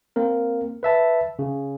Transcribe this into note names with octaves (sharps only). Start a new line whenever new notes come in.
A#3 C4 A#4
B4 E5 A5
C#3